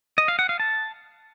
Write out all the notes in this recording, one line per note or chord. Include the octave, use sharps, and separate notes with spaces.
D#5
F5
F#5
F5
A5